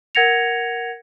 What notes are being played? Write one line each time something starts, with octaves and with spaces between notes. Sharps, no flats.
A#4 F#5 G#6 A#6 C#7 F7